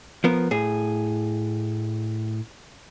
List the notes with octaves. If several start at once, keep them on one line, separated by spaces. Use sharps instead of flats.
F3 B3 A#4
A2 G#4